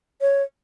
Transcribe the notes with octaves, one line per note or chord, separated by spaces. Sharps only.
C#5